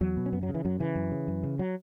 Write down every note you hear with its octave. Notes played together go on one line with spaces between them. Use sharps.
E2 F#3
B2
C#4
F#2 B3
F#3
C#3
E3
F#2 F#3
C#3 E3
F#2
C#3
F#2
C#3
F#3